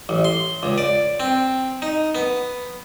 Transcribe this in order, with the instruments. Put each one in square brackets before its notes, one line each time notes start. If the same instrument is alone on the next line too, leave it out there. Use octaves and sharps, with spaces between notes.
[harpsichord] A1
C6
C#2
D5
C4
D#4
B3